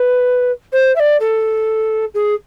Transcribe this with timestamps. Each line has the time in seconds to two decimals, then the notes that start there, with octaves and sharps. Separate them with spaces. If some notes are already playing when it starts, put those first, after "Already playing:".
Already playing: B4
0.72 C5
0.96 E5
1.00 D5
1.20 A4
2.14 G#4